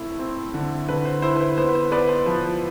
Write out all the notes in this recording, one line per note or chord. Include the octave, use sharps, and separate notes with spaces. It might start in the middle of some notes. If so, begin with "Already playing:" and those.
Already playing: A3 C4 E4
C4
D3
D3 B4
C5
E4 C5
B4
C5
B3 C5
B4
C5
B3 B4 D5
C5
F3